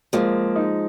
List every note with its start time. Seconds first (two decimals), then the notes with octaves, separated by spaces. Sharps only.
0.13 F3 G#3 A#3
0.56 D#4